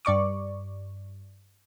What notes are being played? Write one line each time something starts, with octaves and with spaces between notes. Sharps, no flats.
G2 D5 C#6 D6